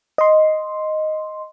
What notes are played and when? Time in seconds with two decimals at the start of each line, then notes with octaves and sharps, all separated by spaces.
0.18 D#5 C6